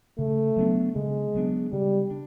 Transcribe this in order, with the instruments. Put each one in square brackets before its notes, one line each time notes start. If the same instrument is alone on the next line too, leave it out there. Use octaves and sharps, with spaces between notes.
[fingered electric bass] C#3 [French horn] A3
[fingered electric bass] F#3 B3 D4
[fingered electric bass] C#3 [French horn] G#3
[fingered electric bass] F#3 B3 D4
[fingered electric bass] C#3 [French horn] G3
[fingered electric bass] D4